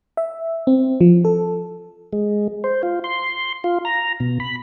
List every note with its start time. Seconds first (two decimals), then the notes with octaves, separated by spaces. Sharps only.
0.17 E5
0.67 C4
1.01 F3
1.25 A4
2.13 G#3
2.64 C5
2.83 F4
3.04 C6
3.64 F4
3.85 A#5
4.20 B2
4.40 B5